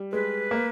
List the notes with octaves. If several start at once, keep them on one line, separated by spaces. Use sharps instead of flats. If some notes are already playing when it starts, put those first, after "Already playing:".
Already playing: G3
G#3 B4
A#3